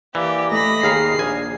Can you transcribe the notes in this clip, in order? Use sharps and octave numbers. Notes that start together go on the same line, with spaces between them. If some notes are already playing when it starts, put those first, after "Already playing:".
E3 A#3 G4 D5
A3 D#5 B5 A#6
D#2 G#4 F5 A#5 C7
A#1 G#5